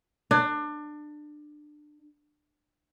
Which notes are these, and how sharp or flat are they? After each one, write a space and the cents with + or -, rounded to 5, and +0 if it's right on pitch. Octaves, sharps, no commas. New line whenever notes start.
D4 +25